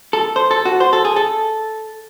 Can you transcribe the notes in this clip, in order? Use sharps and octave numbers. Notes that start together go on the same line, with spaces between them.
A4
C5
A4
F#4
C5
A4
G#4
A4